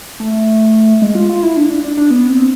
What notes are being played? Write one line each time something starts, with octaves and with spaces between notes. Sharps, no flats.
A3
G#3
F4
F4
E4
D4
E4
D4
D4
D4
B3
C4